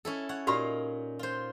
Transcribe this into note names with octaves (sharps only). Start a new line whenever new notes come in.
C#4 E4 A4
C#5 F#5
A#2 D#4 F#4 G4 F5 B5
F4 C5